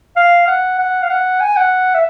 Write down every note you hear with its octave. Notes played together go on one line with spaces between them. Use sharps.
F5
F#5
F#5
F5
F#5
G#5
F#5
E5